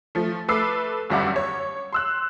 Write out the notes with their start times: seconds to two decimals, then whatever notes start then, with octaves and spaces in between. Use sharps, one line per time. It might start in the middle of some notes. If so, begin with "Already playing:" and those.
0.15 F3 A3
0.48 A3 B4 D6 E6 C7
1.10 G1 F#2 G3 E5 F#5 D6
1.36 C#5
1.93 C6 E6 F#6